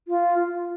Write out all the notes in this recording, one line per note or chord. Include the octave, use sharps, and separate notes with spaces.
F4